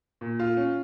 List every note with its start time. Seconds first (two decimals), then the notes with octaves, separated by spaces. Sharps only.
0.21 A#2
0.39 F4
0.57 C#4